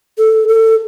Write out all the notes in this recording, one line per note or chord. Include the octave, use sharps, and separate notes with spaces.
A4
A4